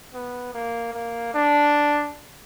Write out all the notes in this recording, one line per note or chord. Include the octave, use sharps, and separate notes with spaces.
B3
A#3
A#3
D4